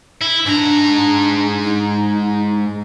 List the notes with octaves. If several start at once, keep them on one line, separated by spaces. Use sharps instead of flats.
E4
G#2 D4 A#5
D#4